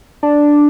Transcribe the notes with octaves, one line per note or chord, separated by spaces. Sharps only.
D4